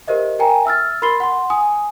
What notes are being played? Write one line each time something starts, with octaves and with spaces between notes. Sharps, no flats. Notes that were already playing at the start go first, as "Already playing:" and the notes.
G4 A#4 C5 D#5 E5
A#4 G5 G#5 A#5
E5 E6 F6 A6
A#4 B5 C6 A6 C7 G7
F#5 C6
G#5 D#6